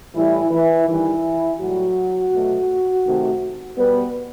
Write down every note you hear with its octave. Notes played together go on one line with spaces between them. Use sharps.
A2 E3 G3 E4
E3 E4
D#3 E3 G3 E4
A2 F#3 G3 F#4
B2 F#3 A3
C3 D#3 A3
B2 G3 B3 B4